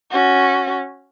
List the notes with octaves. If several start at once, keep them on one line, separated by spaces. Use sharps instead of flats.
C#4 F#4